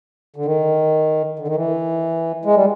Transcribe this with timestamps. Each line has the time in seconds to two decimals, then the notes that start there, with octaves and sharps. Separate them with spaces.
0.36 D3
0.46 D#3
1.39 D3
1.48 D#3
1.55 E3
2.45 G#3
2.56 G3